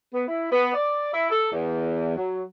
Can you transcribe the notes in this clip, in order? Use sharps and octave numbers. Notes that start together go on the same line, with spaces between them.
B3
E4
B3
D5
E4
A4
E2
F#3